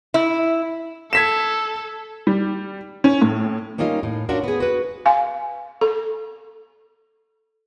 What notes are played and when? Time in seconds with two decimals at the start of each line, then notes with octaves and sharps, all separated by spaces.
0.14 E4
1.13 A4 G#6 B6 E7
2.27 G3
3.04 C#4
3.22 A2
3.78 G3 A#3 C#4 D#4 F4
4.03 A2
4.29 C#4 D4 F4 F#4 A#4
4.44 B3 G#4
4.60 F#4 B4
5.06 F5 G#5
5.81 A4